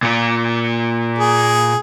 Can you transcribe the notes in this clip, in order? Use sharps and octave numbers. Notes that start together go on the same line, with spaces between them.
A#2 F4
G#4